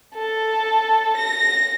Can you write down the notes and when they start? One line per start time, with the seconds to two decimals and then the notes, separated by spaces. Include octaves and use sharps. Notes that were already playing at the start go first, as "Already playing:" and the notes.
0.15 A4
1.17 A#6